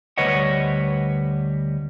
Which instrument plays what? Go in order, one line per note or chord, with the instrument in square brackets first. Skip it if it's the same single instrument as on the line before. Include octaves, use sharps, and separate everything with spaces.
[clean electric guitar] D2 G3 B4 C#5 D#5 F#5